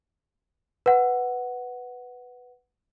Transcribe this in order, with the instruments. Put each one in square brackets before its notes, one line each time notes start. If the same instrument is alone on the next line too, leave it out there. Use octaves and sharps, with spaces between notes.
[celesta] B4 F#5